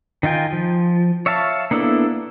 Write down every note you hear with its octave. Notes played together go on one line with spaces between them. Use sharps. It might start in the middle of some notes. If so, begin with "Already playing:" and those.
D#3 D#4 F4 G5 G#5
F3
C#5 E5 F5 A5
A#3 B3 D4 E4 A4